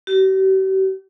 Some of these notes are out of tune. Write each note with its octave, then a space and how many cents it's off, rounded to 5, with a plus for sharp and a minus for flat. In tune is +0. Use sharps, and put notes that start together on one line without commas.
G4 -45